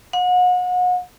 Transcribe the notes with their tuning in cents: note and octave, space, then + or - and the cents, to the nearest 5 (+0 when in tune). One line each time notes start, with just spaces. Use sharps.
F#5 -35